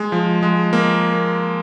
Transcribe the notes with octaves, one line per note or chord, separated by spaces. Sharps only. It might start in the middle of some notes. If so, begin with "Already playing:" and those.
Already playing: G#3
F3
G#3
A#3